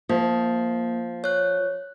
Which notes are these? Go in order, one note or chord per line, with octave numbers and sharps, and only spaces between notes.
F3 A#3
C#5 F#6